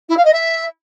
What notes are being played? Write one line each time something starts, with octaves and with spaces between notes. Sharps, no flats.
E4
F5
D#5
E5